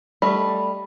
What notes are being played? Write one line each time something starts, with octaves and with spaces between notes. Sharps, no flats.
G3 A3 D#5 B5